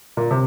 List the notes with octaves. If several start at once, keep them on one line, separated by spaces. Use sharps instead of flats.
A#2
C3